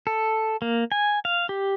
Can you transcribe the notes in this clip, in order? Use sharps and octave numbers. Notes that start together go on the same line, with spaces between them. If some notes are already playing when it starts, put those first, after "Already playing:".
A4
A#3
G#5
F5
G4